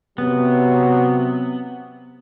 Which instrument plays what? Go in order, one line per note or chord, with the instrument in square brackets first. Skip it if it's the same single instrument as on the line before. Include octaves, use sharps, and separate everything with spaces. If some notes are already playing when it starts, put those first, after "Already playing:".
[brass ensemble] C3 F#3 [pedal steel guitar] B3